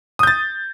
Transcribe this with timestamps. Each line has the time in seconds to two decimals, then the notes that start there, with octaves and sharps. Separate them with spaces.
0.19 D#6
0.23 G6
0.27 A6